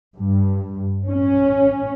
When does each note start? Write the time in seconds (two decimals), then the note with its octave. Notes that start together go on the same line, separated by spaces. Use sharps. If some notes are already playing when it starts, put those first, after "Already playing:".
0.18 G2
1.09 C#4